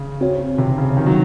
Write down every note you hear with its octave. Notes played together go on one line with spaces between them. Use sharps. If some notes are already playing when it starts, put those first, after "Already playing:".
Already playing: C#3
C4 F#4 C#5
C3
C#3
D#3
F#3